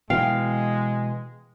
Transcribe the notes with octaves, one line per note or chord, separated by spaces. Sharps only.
B2 E3 G#3 F5 G5